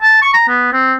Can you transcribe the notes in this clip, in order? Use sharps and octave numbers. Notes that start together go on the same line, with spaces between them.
A5
C#6
A#5
B3
C4